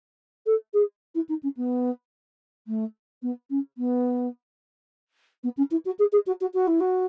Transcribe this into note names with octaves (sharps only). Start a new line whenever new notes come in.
A4
G#4
E4
D#4
C#4
B3
A3
B3
C#4
B3
B3
C#4
E4
F#4
G#4
G#4
F#4
F#4
F#4
E4
F#4